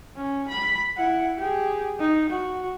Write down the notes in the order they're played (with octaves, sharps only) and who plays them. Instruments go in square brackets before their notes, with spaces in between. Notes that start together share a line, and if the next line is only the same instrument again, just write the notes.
[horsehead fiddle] C#4
B5
E4 F#5
G4 G#4
D#4
F#4